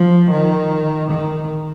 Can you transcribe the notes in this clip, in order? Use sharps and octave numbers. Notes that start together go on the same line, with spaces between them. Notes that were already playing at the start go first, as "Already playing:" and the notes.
Already playing: F3
D#3
D#3